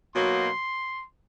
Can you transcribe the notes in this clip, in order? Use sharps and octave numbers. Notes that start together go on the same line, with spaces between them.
B2 F#3 A#3 D#4 C6